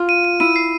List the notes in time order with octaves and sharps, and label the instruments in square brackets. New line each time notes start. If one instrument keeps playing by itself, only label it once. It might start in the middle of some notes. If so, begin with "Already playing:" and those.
Already playing: [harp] F4
[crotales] D#7
D#7
[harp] E4 [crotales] D#7
[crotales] C7